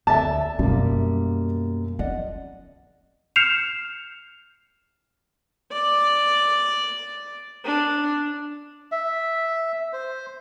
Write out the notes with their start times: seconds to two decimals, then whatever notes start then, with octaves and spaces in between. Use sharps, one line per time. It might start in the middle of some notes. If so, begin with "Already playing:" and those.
0.07 D2 A4 C#5 D5 E5 A5
0.59 F#2 B2 G3 A#3
1.99 C#4 F4 D5 D#5 F#5
3.36 F6 G6 C7 C#7 E7 F7
5.72 D5
7.65 D4
8.92 E5
9.93 C5